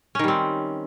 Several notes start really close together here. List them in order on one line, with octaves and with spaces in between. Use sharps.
C#4 D#3 G3 C4